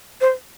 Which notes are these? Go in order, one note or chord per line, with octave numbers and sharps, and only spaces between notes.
C5